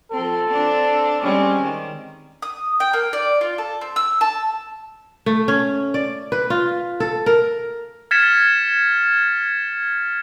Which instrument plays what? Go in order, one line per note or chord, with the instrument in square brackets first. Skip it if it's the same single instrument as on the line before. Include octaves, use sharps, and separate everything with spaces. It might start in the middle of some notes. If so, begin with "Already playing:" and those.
[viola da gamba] F3 C4 [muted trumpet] A4
[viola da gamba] C4 D4
[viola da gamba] G3 G#3 C4 [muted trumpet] C#4
[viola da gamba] D#3
[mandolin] D#6
G5
A#3
D5
F4
A4
C4
E6
A5
[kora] A3
C#4
D5
B4
F4
A4
A#4
[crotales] F6 G#6 A6 B6 C#7 E7